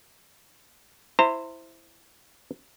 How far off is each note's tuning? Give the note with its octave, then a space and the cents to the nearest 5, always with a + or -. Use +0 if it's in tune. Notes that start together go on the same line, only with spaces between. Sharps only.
E4 +0 C5 +0 A#5 -40